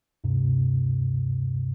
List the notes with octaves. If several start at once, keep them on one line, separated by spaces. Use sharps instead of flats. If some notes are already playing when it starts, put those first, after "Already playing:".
D2 G2 C3